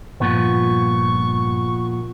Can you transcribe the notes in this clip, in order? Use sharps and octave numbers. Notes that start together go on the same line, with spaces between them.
G2 A#2 F3 B3 C#6